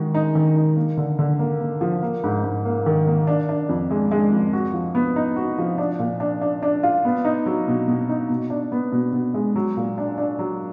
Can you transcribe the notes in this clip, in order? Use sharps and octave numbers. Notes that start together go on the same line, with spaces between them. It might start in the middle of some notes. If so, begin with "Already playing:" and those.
Already playing: D#3 G#3 F#4
D#4
D#3
D#4
A#3
D3
D3
A#3
A#3
F3
A#3
G#2
G#2
A#3
D#3
A#3
D4
D4
F2
G#3
G#3
F2
F#4
F3
B3
D#4
F#4
F3
D4
A#2
D4
D4
D4
F4
B3
D#4
F#3
B2
B2
D#4
B2
D4
B3
B2
B2
G#3
F#3
A#2
D4
D4
F#3